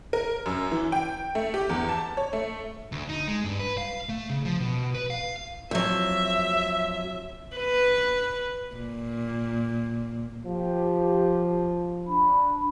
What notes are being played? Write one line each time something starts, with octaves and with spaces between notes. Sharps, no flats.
A#4
F#2
E3
G5
A3
G4
E2
A5
C#5
A3
D2
D#4
G#3
G2
B4
F5
A3
C#3
F3
B2
B4
F5
F2 F#3 E5
B4
A#2
F3 G4
D4 B5